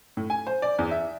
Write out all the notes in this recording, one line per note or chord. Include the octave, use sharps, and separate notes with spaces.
A2
G#5
C5
D5
E2
E5